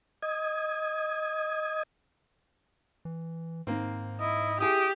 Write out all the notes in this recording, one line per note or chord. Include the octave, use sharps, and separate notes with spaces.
D#5 D#6 G#6
E3
G#2 D#3 A#3 C4
E4 D#5
E4 G4 G#4 D#6